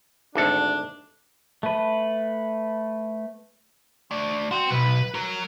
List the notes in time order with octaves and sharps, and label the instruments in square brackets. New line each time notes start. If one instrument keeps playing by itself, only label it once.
[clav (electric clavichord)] G#1 D2 A4 [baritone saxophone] D4
[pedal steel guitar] A3 B4
[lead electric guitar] A3 D5
[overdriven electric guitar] F#4 [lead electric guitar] G5 C6
[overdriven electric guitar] B1 [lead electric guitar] B4
[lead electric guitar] F#3 [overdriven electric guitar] A#4